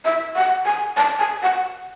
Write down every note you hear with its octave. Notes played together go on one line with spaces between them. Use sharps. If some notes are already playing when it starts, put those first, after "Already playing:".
E5
F#5
G#5
A5
G#5
F#5